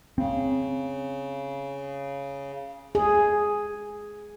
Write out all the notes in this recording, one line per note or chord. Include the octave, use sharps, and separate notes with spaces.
C#3 C4
G#4